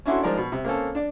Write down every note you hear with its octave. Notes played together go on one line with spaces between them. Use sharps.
C#4 D4 E4 F#4 A4 C6
F3 G#3 D#4 A#4 D5
B2
C3
A#3 C4 C#4 A4
D4 D5